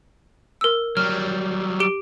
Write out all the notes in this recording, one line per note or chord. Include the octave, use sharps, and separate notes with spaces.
A#4 E6
F#3 G3 F6
G4 D7 G7